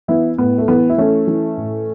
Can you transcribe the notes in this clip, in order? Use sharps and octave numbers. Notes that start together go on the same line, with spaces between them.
E3 B3 E4
A2 B3
A3
E3 B3
E4
E3 A3 C#4
E3
A2